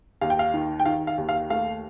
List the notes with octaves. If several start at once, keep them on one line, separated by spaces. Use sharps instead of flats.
D#2 F5
G5
F5
D#3
G5
D#3 F5
F5
D#2
F5
A3 F5